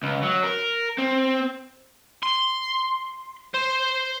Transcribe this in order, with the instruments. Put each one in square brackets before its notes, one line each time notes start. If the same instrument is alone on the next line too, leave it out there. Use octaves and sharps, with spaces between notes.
[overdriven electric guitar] C#2
F#3
A#4
C4
[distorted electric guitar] C6
C5